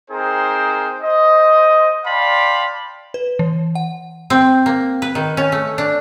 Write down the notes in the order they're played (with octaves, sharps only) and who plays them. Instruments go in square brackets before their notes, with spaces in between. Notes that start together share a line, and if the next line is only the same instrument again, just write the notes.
[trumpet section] C4 D#4 G#4 A#4 C5 G5
C5 D#5
D5 F5 G5 A5 B5 C6
[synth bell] B4
E3
F#5
[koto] C4
A#3
B4
D#3
C#4
A3
D4